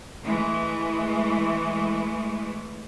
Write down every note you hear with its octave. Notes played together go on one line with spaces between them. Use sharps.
E3 G#3 A3